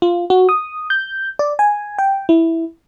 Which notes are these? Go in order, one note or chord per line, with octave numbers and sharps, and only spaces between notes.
F4
F#4
D#6
G6
D5
G#5
G5
E4